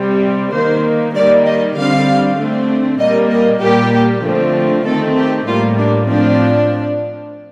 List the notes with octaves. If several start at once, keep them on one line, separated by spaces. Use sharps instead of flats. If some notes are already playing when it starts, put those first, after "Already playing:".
Already playing: C3 G3 C4
D#3 A#3 C5
D#3 G3 A#3 D5
D#5
D3 G3 C4 F5
D3 A3 C4
A#2 G3 A#3 D#5
D#5
A#2 G3 A#3 G4
D3 F3 A3 C4
D#3 A3 C4 A4
G4
A2 G3 A#3 F4
D4
A2 F3 C4 D4